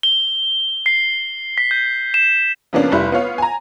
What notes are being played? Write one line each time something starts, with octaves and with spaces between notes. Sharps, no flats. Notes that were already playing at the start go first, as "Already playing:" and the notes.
G7
C7
B6
G6
E7
C#3 F3 A#3 B3 C#4 D4
F1 G3 E4
B3 F4 C#5 F5
G#5 A#5